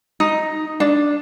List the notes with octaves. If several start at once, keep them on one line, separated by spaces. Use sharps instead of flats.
D#4
D4